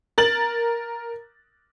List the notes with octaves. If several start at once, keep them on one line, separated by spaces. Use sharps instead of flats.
A#4 A6 F#7